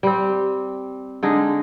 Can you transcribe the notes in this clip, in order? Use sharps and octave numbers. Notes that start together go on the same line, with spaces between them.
G3 C4
D3 G#3 D#4